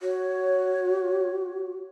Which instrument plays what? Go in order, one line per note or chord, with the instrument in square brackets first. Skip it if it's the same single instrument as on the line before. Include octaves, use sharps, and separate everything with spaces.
[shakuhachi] F#4 [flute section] C#5